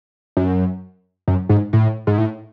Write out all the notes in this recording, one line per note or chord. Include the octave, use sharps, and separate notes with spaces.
F#2
F#2
G#2
A2
G#2
A2